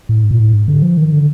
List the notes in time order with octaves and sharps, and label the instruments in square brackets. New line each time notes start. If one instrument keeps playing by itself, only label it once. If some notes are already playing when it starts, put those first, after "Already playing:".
[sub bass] A2
G#2
A#2
A2
G#2
D3
F3
D#3
D3